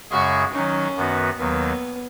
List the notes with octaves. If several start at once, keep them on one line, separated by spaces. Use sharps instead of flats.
F#2 C#3 G#3 C#4 F#4 G#4
D#3 F#3 C#4 D#4
F#2 D#3 B3 F#4 B4
D#2 D#3 F#3 B3